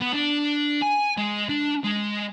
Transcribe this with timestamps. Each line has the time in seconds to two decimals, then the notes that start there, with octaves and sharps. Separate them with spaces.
0.01 B3
0.13 D4
0.82 G#5
1.17 G#3
1.49 D4
1.84 G#3